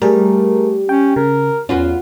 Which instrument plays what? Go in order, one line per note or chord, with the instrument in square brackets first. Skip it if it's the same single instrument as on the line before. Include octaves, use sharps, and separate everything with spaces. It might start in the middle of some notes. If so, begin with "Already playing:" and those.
[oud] G3 [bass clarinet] A3 [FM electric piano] G#4 A#4
[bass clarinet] C#4 [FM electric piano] G5
[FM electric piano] C#3 [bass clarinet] A#4
[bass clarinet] E2 [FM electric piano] C#4 [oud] F4 F#4 B4